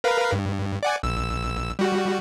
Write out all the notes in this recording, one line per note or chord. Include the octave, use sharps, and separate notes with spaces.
A#4 B4 F5
G2
D5 F#5 G#5
A#1 E6
G3 F#4